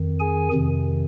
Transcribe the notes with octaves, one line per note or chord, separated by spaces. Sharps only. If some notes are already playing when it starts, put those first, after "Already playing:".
Already playing: F2 D#3
G#4 G#5
F2 C3 D#3